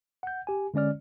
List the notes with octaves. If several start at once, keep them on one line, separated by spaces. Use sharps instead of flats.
F#5 G6
G4 G#5
D3 G#3 C#4 D5 F6